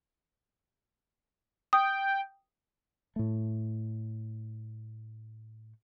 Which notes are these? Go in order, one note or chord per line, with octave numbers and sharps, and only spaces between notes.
G5 D#6
A2 A3